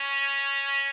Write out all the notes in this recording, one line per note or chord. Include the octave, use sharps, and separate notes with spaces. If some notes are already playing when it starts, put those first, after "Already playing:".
Already playing: C#4